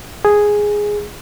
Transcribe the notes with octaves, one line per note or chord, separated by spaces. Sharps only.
G#4